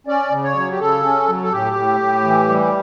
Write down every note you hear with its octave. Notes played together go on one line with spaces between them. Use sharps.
C#4 D5
C#3
C#5
F#3
G4
C#3 A4
C#4
F#3
A4
A2 G4
A2
A2
E3
G3